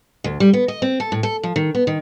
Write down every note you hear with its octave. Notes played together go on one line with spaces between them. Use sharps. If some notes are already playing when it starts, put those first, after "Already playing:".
D2
G3
B3
D#5
C4
A4
A2
A4
F3
D#3
B3
D#3